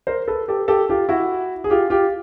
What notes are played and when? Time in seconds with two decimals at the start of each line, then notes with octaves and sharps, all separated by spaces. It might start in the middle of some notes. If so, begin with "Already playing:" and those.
0.07 A#4 C5
0.28 A4 B4
0.48 G4 A4
0.68 G4 A4
0.89 F4 G4
1.09 E4 F#4
1.64 G#4
1.70 F4 G4
1.90 F4 G4